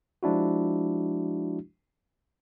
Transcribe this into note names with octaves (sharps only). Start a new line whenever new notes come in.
F3 G#3 D4 E4 F#4